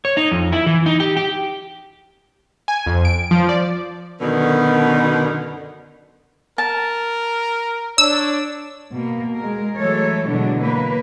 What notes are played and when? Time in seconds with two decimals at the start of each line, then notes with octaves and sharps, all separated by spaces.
0.05 C#5
0.17 D#4
0.31 F2
0.52 E4
0.66 E3
0.86 D#4
1.00 G4
1.17 G4
2.68 G#5
2.86 F2
3.05 D7
3.31 F3
3.49 D5
4.20 F#2 B2 D3 D#3 B3
6.58 A#4 A5
7.98 D4 C#5 E6
8.95 B2 A#3
9.36 G#3 A#4
9.77 E3 F#3 G#3 A3 A4 C#5
10.28 B2 D3 E3 F#3 G#3 D4
10.61 F#3 A#3 B4